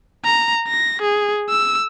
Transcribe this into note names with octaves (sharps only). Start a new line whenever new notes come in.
A#5
A#6
G#4
E6